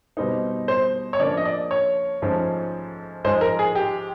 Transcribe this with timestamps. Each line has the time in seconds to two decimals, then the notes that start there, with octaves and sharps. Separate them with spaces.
0.17 B2 G3 C4 D#4
0.68 C5
1.13 C#5
1.19 C#3 F3 A#3 D4 D5
1.37 D#5
1.45 D5
1.71 C#5
2.22 G#2 F3 A3 C#4
3.24 G#2 F3 G#3 C5
3.41 A#4
3.59 G#4
3.75 G4